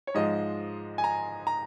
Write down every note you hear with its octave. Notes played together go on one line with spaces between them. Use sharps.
C#5
G#2 F3 G#3 D#5
G#5
A#5
A#5